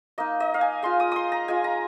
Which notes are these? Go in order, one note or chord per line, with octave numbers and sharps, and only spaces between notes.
A#3 D#4 D#5
D#5
F5
G#5
G#3 F4 C6
D#6
C6 D#6
A#5
G#3 F4 G#5
A#5